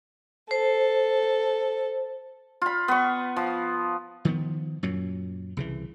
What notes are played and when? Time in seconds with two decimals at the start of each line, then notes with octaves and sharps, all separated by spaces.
0.51 A4 C5
2.62 F4 B5
2.88 B3 C#6
3.36 F3
4.25 D#3 F3 B3
4.83 F#2 A#2 F#3
5.57 C2 C#3 E3